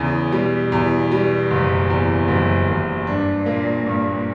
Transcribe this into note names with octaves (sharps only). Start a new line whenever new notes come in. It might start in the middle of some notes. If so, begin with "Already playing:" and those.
Already playing: E2 C#3
B2 G3
E2
G3
F#1
E2
F#1 F#2
F#1 F#2
G2 D4
A#2 A#3
G2 A#2